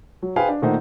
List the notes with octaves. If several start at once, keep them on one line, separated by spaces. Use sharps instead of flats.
F#3
G#4 B4 C5 F5 G5 G#5
D4
A#2 D#3 A3 D#4 C5 F#5